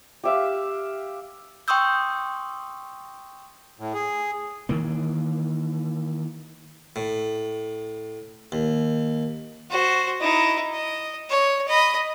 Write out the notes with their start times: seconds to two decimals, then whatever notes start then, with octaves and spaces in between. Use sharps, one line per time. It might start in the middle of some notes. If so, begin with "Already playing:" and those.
0.24 G4 E5 F5
1.68 G5 C6 C#6 D#6 E6 G6
3.79 A2
3.94 G#4
4.69 D#3 E3 A#3
6.96 A2
8.52 D#2
9.70 F#4 C5
10.20 D#4 E4
10.72 D#5
11.29 C#5
11.68 D#5 B5